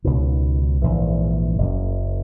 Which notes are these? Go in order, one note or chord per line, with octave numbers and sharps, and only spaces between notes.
C#2 B2 D#3
A#1 G#2 E3
F#1 F#2 C#3